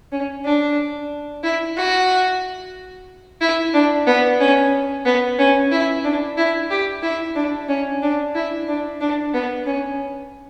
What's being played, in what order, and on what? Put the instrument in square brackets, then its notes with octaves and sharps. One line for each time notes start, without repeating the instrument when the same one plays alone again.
[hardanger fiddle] C#4
D4
E4
F#4
E4
D4
B3
C#4
B3
C#4
E4
D4
E4
G4
E4
D4
C#4
D4
E4
D4
D4
B3
C#4